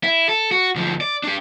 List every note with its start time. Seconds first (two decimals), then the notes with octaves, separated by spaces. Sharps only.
0.04 E4
0.29 A4
0.51 F#4
0.76 D2 F3
1.01 D5
1.24 D4 G4